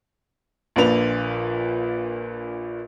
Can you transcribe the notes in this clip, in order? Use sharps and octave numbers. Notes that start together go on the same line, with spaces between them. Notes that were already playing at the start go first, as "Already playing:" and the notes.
A#1 A#2 D4 B4 F7